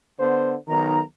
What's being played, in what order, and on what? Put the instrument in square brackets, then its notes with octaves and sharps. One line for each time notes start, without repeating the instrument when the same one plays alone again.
[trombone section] D3 B3 C5
[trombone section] B1 D#3 [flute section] A#5